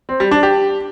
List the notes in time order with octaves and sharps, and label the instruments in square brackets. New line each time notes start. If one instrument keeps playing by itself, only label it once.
[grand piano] C4
G3
D4
G4